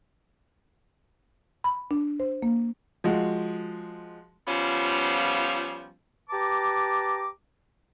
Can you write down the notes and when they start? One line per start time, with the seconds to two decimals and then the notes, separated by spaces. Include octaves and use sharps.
1.64 B5
1.91 D4
2.20 C5
2.42 A#3
3.04 F3 G#3 F#4
4.47 F3 G3 B3 C#4 F4
6.30 G4 B4 A5 A#5 D6